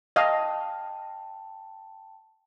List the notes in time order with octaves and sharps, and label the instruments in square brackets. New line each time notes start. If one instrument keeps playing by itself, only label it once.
[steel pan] D#5 F5 [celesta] G5 A5